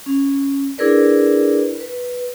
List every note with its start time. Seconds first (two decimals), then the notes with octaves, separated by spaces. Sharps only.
0.06 C#4
0.78 D4 E4 G#4 A#4 B4 D5
1.80 B4